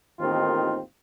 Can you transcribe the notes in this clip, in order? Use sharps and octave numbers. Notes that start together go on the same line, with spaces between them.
A1 D#2 D#3 C4 F4